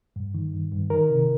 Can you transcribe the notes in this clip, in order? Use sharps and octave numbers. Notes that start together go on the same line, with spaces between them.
G2
D#3
G2
G2
D#3 A#4
C3